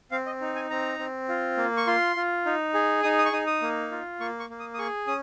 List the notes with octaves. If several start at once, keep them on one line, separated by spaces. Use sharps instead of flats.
C4 F5
D#5
D#4
G#5
C4 A#5
C4
F4
A#3
C#6
F4 C6
F4
D#4
G#4
D#4 D#6
D#6
C#6
D#4 D#6
D#6
A#3
F4
A#3 C#6
C#6
A#3
D#6
D#6
G#4 C#6
C#4 D#6